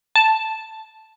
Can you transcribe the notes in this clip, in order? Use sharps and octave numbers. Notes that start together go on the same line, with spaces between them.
A5